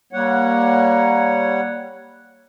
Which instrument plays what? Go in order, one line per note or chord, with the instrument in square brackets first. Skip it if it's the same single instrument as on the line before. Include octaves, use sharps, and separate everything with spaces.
[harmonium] G3 C#5 F#5 [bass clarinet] A#3